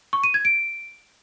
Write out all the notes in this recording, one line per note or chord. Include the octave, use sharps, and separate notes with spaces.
C#6
D#7
G#6
D7